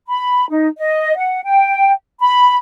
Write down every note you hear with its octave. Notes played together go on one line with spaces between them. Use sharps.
B5
D#4
D#5
F#5
G5
B5